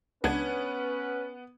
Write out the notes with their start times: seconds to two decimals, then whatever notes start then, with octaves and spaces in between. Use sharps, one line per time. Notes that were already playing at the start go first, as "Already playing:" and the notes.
0.24 C#2 B3 C#4 D4 B4 G#6